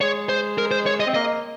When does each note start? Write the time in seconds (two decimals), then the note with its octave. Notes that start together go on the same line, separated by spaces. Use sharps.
0.01 G#3 C#5
0.29 C5
0.58 A#4
0.71 C5
0.86 C#5
1.00 D#5
1.07 C4
1.14 A#3 D#5